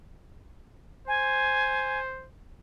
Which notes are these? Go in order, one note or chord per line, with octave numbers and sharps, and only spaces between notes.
C5 G#5